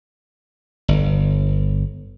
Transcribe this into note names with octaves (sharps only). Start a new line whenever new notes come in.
G1